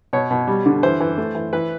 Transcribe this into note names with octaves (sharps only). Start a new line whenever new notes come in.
B2 C#5
B2
G3
D3
E3 C5
E3
A3
E3
E3 B4